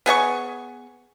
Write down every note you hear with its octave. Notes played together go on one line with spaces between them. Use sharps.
B3 G#4 D#5 C#6